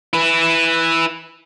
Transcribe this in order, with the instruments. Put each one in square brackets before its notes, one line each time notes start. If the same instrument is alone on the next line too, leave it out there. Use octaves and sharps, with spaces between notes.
[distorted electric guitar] E4 B4